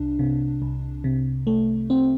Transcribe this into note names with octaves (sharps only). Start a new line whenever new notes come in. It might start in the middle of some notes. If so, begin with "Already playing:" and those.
Already playing: C2 D4
C3
C2
C3
A3
C4